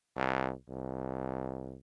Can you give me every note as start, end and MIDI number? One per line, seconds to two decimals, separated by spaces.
0.16 0.52 36
0.69 1.76 36